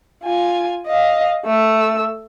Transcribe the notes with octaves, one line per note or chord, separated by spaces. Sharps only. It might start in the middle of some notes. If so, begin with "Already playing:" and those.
F4 G#5
D#5 F5
A3 E6